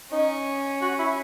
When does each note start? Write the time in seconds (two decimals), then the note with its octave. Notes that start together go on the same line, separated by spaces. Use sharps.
0.12 C#4 D#4
0.81 F#4
0.99 E4